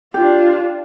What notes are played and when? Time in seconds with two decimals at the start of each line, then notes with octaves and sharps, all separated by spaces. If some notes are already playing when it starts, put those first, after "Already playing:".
0.14 D4 F4 G4